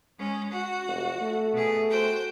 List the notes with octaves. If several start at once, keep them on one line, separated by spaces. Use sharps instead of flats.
G#3 C#4
F#4
F1
A3
B2 G#4
F#4 C5 G5